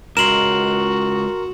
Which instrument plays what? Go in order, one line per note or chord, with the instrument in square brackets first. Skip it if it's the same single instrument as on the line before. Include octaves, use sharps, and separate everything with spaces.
[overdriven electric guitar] C#2 [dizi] F#4 [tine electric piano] A#4 C6 [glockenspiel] E7 F#7